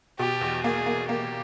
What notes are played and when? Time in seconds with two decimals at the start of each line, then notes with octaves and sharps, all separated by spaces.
0.19 B2 G4
0.41 E2
0.64 A#3 G#4
0.86 A#3
1.08 A#3 G4